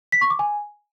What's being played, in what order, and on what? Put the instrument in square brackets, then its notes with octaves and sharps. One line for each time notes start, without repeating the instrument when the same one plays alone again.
[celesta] B6
C#6
D6
G#5